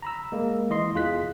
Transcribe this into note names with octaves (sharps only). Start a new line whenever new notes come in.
A#5 B5 E6
G#3 A#3
E3 E4 D#5 C6 C7
E2 F4 G#4 F#6 B6